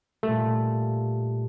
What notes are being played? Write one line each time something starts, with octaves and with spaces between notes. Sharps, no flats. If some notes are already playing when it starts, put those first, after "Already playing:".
A#2 G3 A3